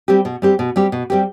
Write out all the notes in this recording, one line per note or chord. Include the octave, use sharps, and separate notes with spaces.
G3 C4 G4
B2
G3 C4 G4
B2
G3 C4 G4
B2
G3 C4 G4